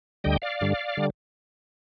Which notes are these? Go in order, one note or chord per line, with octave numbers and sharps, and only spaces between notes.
D2 D3 G3 D#5 G5
D5 F5
G2 D3 G3
D3 G3